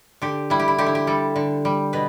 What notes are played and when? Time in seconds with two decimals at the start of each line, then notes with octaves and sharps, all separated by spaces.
0.22 D3 G4
0.50 G3 E4
0.60 G4
0.68 E4
0.78 D3 G4
0.86 E4
0.95 G4
1.07 G3 A4
1.36 D3
1.65 G3
1.93 B2 B4